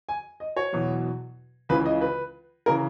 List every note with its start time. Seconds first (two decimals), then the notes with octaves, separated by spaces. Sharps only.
0.09 G#5
0.40 D#5
0.57 C#5
0.73 E2 B2 F#3
1.69 C#2 C#3 E3 B4
1.86 D#5
2.01 B4
2.66 C#3 E3 A#4